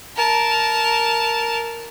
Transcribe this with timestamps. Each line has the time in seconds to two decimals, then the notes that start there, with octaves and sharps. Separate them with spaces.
0.16 A#4 A5